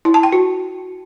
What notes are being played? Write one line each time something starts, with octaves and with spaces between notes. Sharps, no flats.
E4
A5
G5
F#4